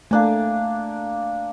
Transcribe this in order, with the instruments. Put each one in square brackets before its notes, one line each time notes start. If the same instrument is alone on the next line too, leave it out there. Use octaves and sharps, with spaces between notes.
[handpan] A3 [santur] A#3 D4 G#5